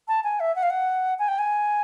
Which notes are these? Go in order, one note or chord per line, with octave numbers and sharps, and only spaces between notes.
A5
G#5
E5
F#5
F5
F#5
G#5
G5
G#5